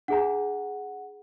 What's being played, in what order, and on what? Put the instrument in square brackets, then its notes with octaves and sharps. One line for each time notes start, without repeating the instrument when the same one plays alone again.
[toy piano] D4 G#4 A#5 [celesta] F#5